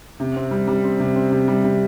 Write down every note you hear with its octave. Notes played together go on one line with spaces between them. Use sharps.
C3
C4
G3
G3
C4
C3
C4
C3
G3
C3